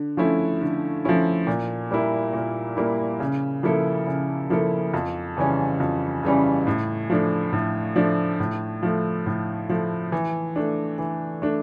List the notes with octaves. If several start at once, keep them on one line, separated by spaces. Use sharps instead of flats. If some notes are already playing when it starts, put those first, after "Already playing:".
Already playing: D3
F3 A3 C#4 E4
D3
F3 A3 C#4 E4
A#2
G3 A#3 E4
A#2
G3 A#3 E4
C#3
F3 A#3 E4 A4
C#3
F3 A#3 E4 A4
F2
C#3 E3 G3 C#4
F2
C#3 E3 G3 C#4
A2
F3 A3 D4
A2
F3 A3 D4
A2
F3 A3
A2
F3 A3
E3
A3 D4
E3
A3 D4